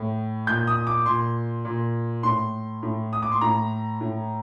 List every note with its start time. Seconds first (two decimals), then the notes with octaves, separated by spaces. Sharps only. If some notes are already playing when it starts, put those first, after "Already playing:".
Already playing: A2
0.47 A#2 G6
0.67 D#6
0.87 D6
1.06 A#2 C6
1.65 A#2
2.23 A2 C6
2.83 A2
3.13 D#6
3.23 D6
3.32 C6
3.41 A2 A#5
4.01 A2